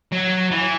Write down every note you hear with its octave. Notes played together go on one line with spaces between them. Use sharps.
F#3
E3